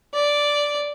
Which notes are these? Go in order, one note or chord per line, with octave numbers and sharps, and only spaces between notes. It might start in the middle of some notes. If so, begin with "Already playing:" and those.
D5